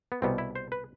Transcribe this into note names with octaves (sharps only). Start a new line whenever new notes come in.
B3
C2 B2 G3 B3 C4
E4
C5
B4